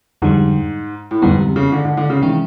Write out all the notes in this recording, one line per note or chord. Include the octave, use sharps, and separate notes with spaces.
F2 G#2 D3 G3
A2
F2 G#2 D3 G3 B3
C3
C#3
D3
D3
D3
C#3
C3 D#3 E3 G#3 C#4